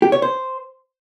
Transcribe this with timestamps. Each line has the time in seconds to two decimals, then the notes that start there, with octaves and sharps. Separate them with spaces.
0.02 G4
0.12 C#5
0.22 C5